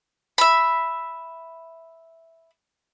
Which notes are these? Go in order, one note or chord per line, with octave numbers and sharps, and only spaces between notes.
E5 B5